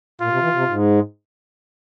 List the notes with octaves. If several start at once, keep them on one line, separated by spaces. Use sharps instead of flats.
A#2 F4
C3
E3
C3
G#2